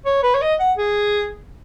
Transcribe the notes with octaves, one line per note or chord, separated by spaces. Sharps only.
C#5
B4
C#5
D#5
F#5
G#4